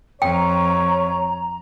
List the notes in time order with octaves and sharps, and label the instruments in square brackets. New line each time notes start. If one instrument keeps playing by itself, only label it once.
[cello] F2 [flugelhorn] C#5 [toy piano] G5 [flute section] A#5